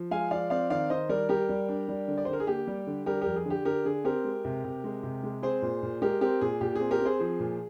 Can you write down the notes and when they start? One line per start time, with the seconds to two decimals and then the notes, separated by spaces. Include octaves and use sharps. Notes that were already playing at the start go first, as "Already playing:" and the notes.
Already playing: F3
0.11 G#3 F5 G#5
0.31 F3 D5 F5
0.50 C4 D5 F5
0.70 D#3 D5 F5
0.90 D#3 C5 D#5
1.09 G3 A#4 D5
1.29 G3 G4 A#4
1.49 G3
1.69 D4
1.88 G3
2.08 D3
2.18 D5
2.25 C5
2.28 D3
2.33 A#4
2.40 G#4
2.47 A#3 G4
2.67 G3
2.87 D3
3.06 G3 G4 A#4
3.21 F2 G4 A#4
3.36 G#4
3.45 D3
3.50 G4
3.65 D3 G4 A#4
3.85 D3 G#4
4.05 C4 G4 A#4
4.24 G#3
4.45 C3
4.64 C3
4.84 G#3
5.03 C3
5.23 G#3
5.43 C4 G#4 C5
5.62 A#2
5.83 A#2
6.02 G#3 G4 A#4
6.21 C4 G4 A#4
6.41 A#2 G#4
6.61 A#2 G4
6.75 G#4
6.81 C4
6.91 G4 A#4
7.00 C4
7.05 G#4 C5
7.20 F3 G#4
7.40 A#2